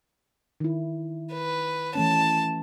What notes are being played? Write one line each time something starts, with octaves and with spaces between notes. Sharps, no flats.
D#3 E4
B4
E3 A3 C#4 A5